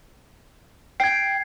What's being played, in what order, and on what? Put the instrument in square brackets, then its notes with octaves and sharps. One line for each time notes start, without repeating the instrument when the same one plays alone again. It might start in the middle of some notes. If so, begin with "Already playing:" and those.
[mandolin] G5 [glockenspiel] G#6 C7